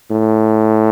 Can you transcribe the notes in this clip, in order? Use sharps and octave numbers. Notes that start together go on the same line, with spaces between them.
A2